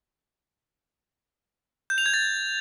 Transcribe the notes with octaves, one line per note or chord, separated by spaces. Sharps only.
G6
F7
G#6
A6